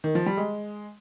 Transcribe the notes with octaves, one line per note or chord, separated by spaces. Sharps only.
D#3
F3
G3
G#3